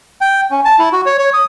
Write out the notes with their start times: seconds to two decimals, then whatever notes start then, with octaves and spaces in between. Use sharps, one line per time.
0.21 G5
0.51 C#4
0.65 A5
0.79 E4
0.92 F#4
1.06 C#5
1.18 C#5
1.34 D#6